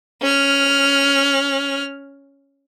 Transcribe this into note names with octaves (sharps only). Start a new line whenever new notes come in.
C#4 F6